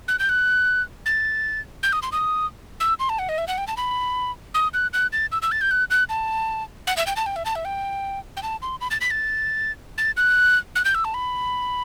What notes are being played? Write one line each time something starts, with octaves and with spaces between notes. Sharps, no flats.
F#6
G6
F#6
A6
G6
D#6
C6
D#6
E6
C6
A5
F#5
D#5
E5
F#5
G5
A5
B5
D#6
F#6
F#6
A6
E6
E6
A6
G6
F#6
F#6
A5
F#5
E5
G5
A5
G5
E5
A5
E5
G5
G5
A5
C6
B5
A6
B6
A6
A6
F#6
F#6
G6
E6
A5
B5